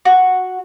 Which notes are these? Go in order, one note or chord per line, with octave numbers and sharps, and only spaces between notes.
F#4